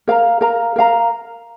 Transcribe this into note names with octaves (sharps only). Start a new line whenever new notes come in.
A#4 F5 A#5
A#4 F5 A#5
A#4 F5 A#5